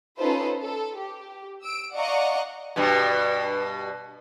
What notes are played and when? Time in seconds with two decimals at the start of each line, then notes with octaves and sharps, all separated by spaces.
0.18 C#4 D#4 F4 A4 B4 C5
0.62 A4
0.98 G4
1.63 E6 D7
1.96 D5 D#5 F5 F#5 A#5 C#6
2.76 G2 B2